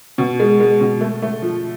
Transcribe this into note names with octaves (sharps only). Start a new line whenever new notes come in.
B2
G#3
G#3
B2
A3
A3
F3